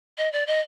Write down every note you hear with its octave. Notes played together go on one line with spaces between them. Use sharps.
D#5
D5
D#5